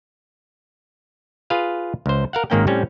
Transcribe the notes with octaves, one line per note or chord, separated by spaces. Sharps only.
F4 G#4 B4 F5
C#2 C5
A#4 F5 F#5
G#1 G#2 D#3 A#3 C#4 G5
A2 G3 C4 C#4